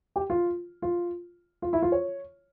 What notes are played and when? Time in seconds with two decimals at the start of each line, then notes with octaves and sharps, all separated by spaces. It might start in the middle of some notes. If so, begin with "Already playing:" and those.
0.16 G4
0.30 F4
0.82 F4
1.62 F4
1.73 E4
1.82 F4
1.92 C#5